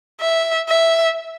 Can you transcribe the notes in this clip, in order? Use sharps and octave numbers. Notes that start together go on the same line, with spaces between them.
E5
E5